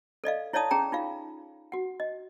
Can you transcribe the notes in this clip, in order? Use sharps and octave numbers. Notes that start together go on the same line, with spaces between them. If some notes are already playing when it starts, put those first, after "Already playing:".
A4 D5 D#5 F5
E4 C#5 D5 F5 A5 D#6
C#4 G#4 G5 A#5
D#4 F4 F5
F#4 F#5
D#5